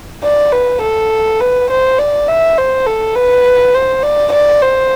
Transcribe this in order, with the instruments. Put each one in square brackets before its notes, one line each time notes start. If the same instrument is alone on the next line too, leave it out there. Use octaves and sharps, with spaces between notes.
[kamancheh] D5
B4
A4
B4
C5
D5
E5
C5
A4
B4
C5
D5
D5
C5